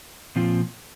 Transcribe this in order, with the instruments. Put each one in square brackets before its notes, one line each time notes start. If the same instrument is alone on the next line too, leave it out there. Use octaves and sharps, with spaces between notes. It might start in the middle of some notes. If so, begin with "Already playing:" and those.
[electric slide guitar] A#2 F3 C4 F4